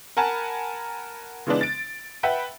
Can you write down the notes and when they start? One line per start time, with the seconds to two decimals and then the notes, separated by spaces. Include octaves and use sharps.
0.17 A#4 F#5 G#5 A5 B5
1.47 C#3 E3 G#3 B3 D4
1.61 A6 D7
2.23 B4 E5 F#5 G5 B5